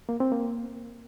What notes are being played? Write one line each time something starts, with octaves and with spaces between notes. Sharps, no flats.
A#3
C4
A#3